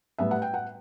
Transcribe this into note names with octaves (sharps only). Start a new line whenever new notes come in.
A2 G3 B3 E5
F#5
G5
F#5